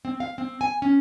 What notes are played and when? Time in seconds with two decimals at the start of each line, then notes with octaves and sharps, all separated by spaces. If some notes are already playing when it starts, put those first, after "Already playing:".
0.05 C4
0.20 F5
0.38 C4
0.61 G#5
0.82 C#4